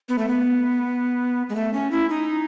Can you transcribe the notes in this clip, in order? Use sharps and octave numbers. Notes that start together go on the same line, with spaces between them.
B3
A3
B3
G#3
A3
C#4
E4
D#4